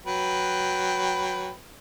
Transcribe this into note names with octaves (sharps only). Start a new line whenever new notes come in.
F#3 B4 G5